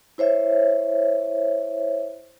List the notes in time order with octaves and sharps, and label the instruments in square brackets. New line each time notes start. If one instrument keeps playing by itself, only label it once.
[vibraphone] E4 C5 C#5 E5